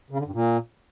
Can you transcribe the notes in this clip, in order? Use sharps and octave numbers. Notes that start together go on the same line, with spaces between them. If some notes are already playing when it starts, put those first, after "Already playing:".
C#3
D3
G2
A#2